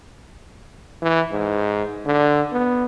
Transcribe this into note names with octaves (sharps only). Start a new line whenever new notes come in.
E3
G#2
D3
B3